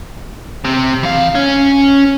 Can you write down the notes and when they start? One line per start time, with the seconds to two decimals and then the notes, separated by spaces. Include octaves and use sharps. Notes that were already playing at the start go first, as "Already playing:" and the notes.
0.65 C3
1.03 E3 F5
1.35 C#4